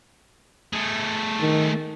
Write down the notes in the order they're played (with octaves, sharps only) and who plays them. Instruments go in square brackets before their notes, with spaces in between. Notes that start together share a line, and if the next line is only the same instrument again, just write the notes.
[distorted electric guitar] A3 G#4
[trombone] D#3